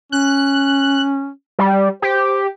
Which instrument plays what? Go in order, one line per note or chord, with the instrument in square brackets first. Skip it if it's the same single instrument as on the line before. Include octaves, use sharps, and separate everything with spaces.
[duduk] C#4 [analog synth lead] F#6
[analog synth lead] G3
[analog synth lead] G4 [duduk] C5